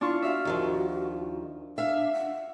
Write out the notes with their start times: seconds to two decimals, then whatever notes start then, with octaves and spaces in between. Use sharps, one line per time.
0.01 D4 E4 F4 C#6
0.22 F#4 E5 F5
0.45 D#2 D#3 F3
1.78 D4 E5 F5
2.14 F#5